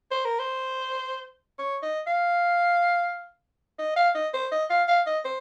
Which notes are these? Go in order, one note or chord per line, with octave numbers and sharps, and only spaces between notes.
C5
A#4
C5
C#5
D#5
F5
D#5
F5
D#5
C5
D#5
F5
F5
D#5
C5